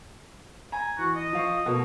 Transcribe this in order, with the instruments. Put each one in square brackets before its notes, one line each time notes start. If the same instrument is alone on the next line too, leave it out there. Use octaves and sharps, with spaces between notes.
[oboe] G#5 [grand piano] A#5
[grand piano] E3 [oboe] F#4
[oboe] D#5
[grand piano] F3 F5 C#6
B2 A3 A#3